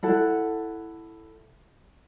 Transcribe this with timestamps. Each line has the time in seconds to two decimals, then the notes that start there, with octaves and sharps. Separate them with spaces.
0.03 E4 A4 F#5